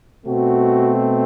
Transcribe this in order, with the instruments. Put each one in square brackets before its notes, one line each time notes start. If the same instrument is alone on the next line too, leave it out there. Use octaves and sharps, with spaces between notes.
[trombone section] B2 A3 C4 F#4